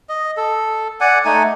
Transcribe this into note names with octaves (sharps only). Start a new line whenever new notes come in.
D#5
A4
D5 F#5 G#5
A3 D#4 G#5